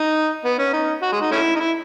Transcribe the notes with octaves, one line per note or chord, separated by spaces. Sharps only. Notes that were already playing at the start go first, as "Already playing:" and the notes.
Already playing: D#4
B3
C#4
D#4
F#4
G#3
D#4
A3 C#4 E4
D#4
E4